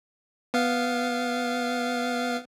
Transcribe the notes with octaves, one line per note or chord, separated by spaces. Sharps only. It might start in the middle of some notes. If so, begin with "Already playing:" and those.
B3 F5